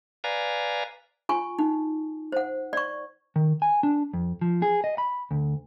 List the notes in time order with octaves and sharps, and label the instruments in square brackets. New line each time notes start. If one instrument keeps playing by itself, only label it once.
[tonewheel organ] B4 D5 F5 G#5 A#5
[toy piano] F4 G#5 C#6
D#4
C5 F#5
D5 C#6
[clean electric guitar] D#3
G#5
D4
F2
F3
G#4
D#5
B5
D2